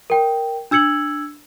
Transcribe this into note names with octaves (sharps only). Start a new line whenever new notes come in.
A#4 G5
D4 E6 G#6 C#7 F#7